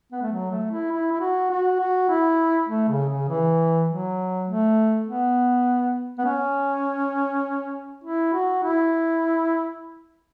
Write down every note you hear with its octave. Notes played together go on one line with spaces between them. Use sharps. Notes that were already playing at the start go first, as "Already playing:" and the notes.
B3
A3
F#3
A3
E4
E4
E4
F#4
F#4
F#4
E4
A3
C#3
C#3
E3
F#3
A3
B3
B3
C#4
E4
F#4
E4